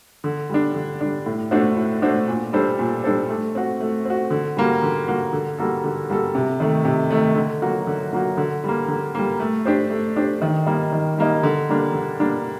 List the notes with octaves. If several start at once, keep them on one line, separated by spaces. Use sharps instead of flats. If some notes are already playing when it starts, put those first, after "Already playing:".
D3
G3 D4
D3
G3 D4
A2
A3 D4 F#4 C5
A2
A3 D4 F#4 C5
A#2
G3 D4 A4 C5
A#2
G3 D4 A4 C5
A3
C4 F#4
A3
C4 F#4
D3
G3 A#3 F#4
D3
G3 A#3 F#4
D3
G3 A#3 F#4 A4
D3
G3 A#3 F#4 A4
C3
D#3 A3
C3
D#3 A3
D3
F#3 A#3 F#4
D3
F#3 A#3 F#4
D3
G3 A#3
D3
G3 A#3
A3
D4 G4 C5
A3
D4 G4 C5
D#3
G3 A#3 D#4
D#3
G3 A#3 D#4
D3
G3 A#3 D4
D3
G3 A#3 D4